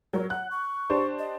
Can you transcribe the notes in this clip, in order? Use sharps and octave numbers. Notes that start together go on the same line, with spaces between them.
F#3 A#4 C#5
F#5 F#6
C#6
D4 G4 C5
D#5